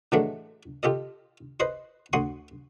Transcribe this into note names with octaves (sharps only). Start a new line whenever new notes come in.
A2 E3 F#3 G#3 A3 D4
F4 G4 A4 D#5
B4 C5 D#5 C6
D2 F#4 C6 C#6 D#6